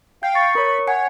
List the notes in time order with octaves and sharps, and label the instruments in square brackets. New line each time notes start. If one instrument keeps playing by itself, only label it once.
[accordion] F5 G5 [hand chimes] G6
[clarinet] C#6 [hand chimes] A6
[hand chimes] A#4 C#5 [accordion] B5
[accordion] C#5 [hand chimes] F#5 G#5 C#7